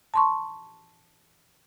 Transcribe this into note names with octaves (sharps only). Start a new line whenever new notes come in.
A5 C6 C#6